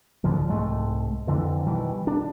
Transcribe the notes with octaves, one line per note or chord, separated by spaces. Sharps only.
C#2 G#2 D3 F3
C2 G#2 G#3 A3
F2 D3 E3
B2 D#3 E3 G3
D4